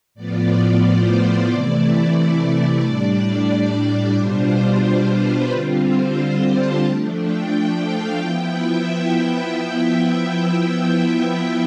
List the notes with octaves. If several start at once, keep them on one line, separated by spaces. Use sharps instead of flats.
A2 F3 B3 F4 D5
C5
C3 E3 A3 E4 D5
D5
A2 G3 D4 D5
D5
B2 G3 D4 F4 C5
B4
D3 G3 C4 F4
C5
A5
F3 A3 D4
G5
G5
F5
F3 B3 E4 G5
E5